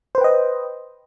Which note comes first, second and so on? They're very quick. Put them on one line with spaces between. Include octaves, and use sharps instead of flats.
C5 B4 G5 D#5